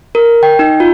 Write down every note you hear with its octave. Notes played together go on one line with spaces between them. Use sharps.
A#4
G5
D#4
F4